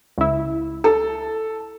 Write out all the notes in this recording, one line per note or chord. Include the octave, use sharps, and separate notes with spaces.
C#2 E4
A4